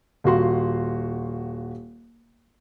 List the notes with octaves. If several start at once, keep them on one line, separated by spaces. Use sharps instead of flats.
D#1 F4 F#4 C6